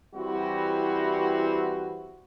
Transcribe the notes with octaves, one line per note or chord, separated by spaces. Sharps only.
E3 G3 C4 E4 F#4